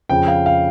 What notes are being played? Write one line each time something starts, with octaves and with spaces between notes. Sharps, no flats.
F2 C#3 F3 G5
F5
F5